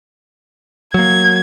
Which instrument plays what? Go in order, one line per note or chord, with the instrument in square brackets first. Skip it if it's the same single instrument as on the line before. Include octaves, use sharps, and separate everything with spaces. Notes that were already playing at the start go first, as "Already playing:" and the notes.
[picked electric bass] F#3 A#3 [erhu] G#6